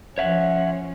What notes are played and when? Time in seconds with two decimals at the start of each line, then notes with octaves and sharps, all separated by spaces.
0.18 F3 C#4 C#5 E5 F#5